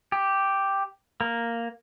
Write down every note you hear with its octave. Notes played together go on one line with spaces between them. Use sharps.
G4
A#3